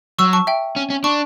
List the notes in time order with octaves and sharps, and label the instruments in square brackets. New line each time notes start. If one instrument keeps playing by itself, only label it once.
[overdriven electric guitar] F#3 [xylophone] C#6 E6
[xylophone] A5 C#6
E5 G5
[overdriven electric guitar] C#4
C#4
[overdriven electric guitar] D4 [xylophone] A5 C#6